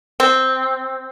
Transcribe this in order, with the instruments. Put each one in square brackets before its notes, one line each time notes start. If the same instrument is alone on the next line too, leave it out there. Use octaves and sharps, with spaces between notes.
[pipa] C4